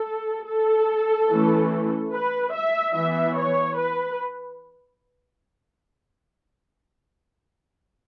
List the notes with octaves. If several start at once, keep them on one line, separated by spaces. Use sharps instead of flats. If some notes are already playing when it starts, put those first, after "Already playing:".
Already playing: A4
A4
E3 A3 C#4
B4
E5
E3 B3 E5
C#5
B4